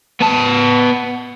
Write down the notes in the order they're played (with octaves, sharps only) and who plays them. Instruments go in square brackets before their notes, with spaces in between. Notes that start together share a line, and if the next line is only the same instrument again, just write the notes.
[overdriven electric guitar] B3 A5